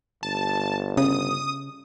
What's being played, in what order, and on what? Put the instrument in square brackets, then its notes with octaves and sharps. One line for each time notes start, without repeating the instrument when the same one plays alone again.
[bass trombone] G1 [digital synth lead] A5
[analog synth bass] C#3 [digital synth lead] D#6